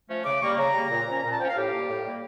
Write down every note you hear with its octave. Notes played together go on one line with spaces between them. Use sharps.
F3 A3 C#4
C#3 D6
G3 A#3 C#6
C#3 A#5
G3 A#3
A#2
F3 C#4
A#2 A#5
A5
F3 C#4 G5
F5
A2 G4
A#3
G3
A2
G3 A#3